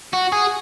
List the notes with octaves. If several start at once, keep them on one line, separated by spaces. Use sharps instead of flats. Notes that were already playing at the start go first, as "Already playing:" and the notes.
F#4
G#4